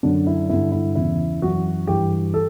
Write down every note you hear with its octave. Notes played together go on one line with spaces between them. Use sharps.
F#2 D3 D4
E4
G2 D3 E4
E4
E2 C#3 E3 E4
F#2 E3 F#4
G2 E3 G4
A4